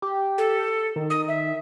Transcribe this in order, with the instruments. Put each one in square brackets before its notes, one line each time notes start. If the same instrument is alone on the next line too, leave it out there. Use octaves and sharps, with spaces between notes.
[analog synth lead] G4
[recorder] A4
[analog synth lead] D#3
[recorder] D#6
E5